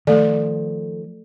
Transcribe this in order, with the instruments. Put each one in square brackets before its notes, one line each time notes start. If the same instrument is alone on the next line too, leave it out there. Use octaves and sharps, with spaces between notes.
[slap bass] D#3 F3 [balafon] A3 D5 [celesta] A4